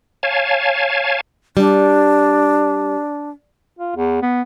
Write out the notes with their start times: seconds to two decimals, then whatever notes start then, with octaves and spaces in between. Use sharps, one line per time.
0.23 C#5 F5 G#5 A5
1.57 G3 D4
3.79 F4
3.96 E2
4.22 B3